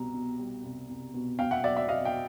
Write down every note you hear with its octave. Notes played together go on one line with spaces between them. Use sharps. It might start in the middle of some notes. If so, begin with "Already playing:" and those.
Already playing: C2 B2 G3 A#5
B2
G3
C2
C2
B2
B2 F5 G5
E5 F#5
F#3 D5 E5
D5 E5
F#3 D#5 F5
F5 G5